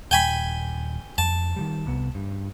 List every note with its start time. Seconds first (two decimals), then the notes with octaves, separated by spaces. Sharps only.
0.11 D#1 G5 G#5 B5
1.18 F2 A5
1.56 D#3 F3 G3
1.86 C2 C3 B3
2.15 G2